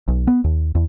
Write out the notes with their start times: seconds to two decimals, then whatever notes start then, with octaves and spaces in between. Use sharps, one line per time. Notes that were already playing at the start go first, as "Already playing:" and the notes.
0.08 B1
0.27 B3
0.44 D#2
0.75 E2